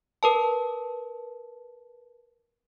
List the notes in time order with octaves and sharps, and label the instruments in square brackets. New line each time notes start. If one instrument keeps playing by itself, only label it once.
[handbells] A#4 B4 A5